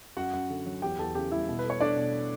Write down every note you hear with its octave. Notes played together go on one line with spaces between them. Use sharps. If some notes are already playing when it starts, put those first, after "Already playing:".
F#2 F#4 F#5
F#2
D3
F#3
E2 G4 G5
E2 A4 A5
C#3 G4 G5
G3 E4 E5
B2
B4
A3
C#5
A3 D4 D5
B2